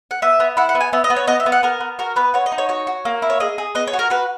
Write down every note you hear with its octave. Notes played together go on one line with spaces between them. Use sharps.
F#5
B3 E5
B3
E4 F#5
F#5
B3
G#5
B3 E5
D#5
B3
C#5
B3 D#5
E5
B3
F#5
B3 A#4
B3
F#4 A#4
B3 B4
F#4 C#5
D#5
D#4
C#5
F#4 C#5
F#4
A#3
E4
C#5
G#4 D#5
G#4
B3 D#5
C#5
F#4
A#4
F#4 B4